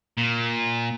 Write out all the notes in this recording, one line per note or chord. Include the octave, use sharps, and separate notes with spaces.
A#2